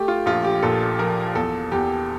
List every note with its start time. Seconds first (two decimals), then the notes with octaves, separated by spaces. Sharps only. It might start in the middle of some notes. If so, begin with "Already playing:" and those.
Already playing: A3 G4
0.08 F4
0.26 A#1 F4
0.44 G4
0.63 A#2 A4
0.99 F3 A#4
1.35 E2 A4
1.72 E2 G4